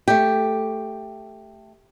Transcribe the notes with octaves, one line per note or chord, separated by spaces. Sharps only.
A3 G4